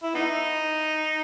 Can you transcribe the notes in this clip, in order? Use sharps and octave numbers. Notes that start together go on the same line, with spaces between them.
E4
B3 D#4